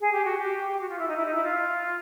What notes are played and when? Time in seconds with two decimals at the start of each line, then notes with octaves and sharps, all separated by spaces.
0.01 G#4
0.12 G4
0.25 F#4
0.38 G4
0.72 G4
0.81 F#4
0.89 F4
0.99 E4
1.08 D#4
1.17 E4
1.25 D#4
1.35 E4
1.43 F4